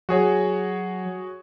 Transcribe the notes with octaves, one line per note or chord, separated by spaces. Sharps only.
F#3 F#4 G#4 C#5